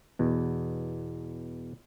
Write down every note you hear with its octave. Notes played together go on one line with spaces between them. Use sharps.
E2 B2